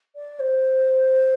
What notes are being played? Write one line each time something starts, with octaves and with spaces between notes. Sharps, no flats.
D5
C5